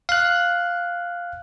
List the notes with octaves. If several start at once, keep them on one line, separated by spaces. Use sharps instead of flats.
F5 F#6